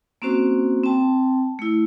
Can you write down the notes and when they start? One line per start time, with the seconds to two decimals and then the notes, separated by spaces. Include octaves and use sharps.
0.22 A#3 C4 C#4 F#4 C5
0.84 C4 G5 A5
1.59 A3 E4